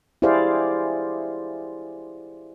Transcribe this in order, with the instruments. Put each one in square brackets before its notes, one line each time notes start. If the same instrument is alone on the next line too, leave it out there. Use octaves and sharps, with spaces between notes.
[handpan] E4 G4 G#4 C5 D5 F5